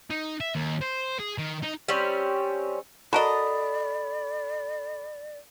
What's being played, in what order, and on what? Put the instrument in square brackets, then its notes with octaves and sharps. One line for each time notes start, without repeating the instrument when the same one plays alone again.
[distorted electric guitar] D#4
E5
D#2
C5
G#4
D#3
D#4
[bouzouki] G3 C4 C#4
[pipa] F#4 A#4 D#5 [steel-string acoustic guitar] A4 [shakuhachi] D5 [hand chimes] B5